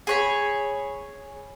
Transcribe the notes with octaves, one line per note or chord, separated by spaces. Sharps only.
G#4 C#5 B5